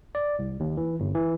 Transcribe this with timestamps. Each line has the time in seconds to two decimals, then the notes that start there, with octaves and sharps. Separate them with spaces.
0.15 D5
0.39 C2
0.60 D#2
0.77 E3
1.00 G1
1.15 E3